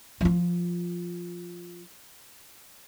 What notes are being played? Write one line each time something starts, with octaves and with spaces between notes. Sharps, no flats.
F3 F4